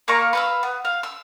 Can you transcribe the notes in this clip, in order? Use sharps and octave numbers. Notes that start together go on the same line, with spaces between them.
A#3 F5 A#5 C#6
B4 F5 E6
B3
F5
E6